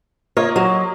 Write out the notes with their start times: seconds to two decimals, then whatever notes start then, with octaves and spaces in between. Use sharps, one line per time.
0.37 A#3 F4 C#5 D#5
0.56 F#3